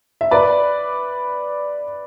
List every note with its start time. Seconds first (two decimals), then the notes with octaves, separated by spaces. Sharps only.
0.21 E5
0.31 B4 D5